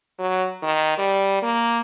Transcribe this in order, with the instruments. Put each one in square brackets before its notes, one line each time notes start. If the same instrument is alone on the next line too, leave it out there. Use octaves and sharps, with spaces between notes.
[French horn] F#3
D#3
G3
A#3